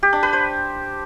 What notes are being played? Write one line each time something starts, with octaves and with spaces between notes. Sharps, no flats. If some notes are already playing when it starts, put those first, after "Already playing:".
G4
D4
B4
C5